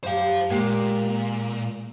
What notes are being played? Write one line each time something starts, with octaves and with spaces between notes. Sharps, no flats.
F#2 G4 C5 F5
A#2 G#3 A#3 G4